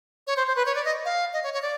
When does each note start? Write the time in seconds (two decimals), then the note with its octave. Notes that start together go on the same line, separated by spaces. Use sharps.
0.27 C#5
0.37 C5
0.47 C5
0.56 B4
0.66 C#5
0.75 D5
0.85 D#5
1.05 F5
1.33 D#5
1.44 C#5
1.54 C#5
1.62 D5